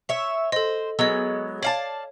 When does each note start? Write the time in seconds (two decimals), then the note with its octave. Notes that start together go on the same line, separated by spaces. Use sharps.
0.09 C#5 E5
0.52 A4 C5 D#5
0.99 F#3 G#3 B3 D#5 E6
1.63 C#5 D5 F5 A5